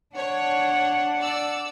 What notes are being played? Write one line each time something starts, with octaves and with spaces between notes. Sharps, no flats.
D4 C#5 F#5
D5 E6